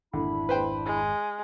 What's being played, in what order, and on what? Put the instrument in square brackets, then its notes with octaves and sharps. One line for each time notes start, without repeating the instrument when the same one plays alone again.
[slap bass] G#1 F2 [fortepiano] D3 [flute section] D4 E4 B5
[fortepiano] B4 C5 G5
[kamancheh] G#3